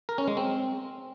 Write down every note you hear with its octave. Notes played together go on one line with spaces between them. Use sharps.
A#4
C#4
G#3
C4